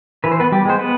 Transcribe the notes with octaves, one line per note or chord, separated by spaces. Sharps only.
E3 B4
C5
B3 B4
G3 G4
G#3 B3 C5
B3 B4